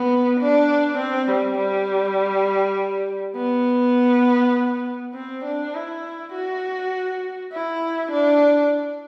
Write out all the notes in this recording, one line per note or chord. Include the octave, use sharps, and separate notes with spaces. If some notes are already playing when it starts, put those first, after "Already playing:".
Already playing: B3
D4
C4
G3
G3
B3
C4
D4
E4
F#4
E4
D4